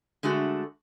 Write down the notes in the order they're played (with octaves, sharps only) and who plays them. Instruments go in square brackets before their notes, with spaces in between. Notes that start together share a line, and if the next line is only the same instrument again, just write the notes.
[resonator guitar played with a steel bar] D3 G#3 A3 F#4